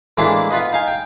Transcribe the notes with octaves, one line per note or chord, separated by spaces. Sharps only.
A2 E3 G#3 A#3 D4 E4
B3 F4 B4 D#5
D#4 F5 G#5
G5